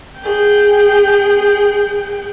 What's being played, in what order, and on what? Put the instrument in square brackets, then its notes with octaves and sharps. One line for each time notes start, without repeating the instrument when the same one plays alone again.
[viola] G#4 G5